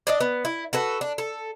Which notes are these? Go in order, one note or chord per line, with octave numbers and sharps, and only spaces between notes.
D4 D5 D#5
B3
E4
F#4 A4 B4
D4
A4